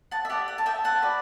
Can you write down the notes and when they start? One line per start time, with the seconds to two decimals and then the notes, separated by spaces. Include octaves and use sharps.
0.11 F#5 A5
0.25 E5
0.30 G4 D5 F#5
0.48 F#5
0.58 A5
0.66 E5 G5
0.84 F#5 A5
1.02 F#4 B4 D5